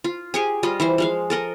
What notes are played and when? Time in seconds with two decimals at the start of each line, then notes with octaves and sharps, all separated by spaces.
0.04 F4
0.34 G4 G#4 G#5
0.63 G3 F4 D#5
0.80 E3 E4 C5
0.98 F3 G#3 F5
1.30 A4 A#4 D#5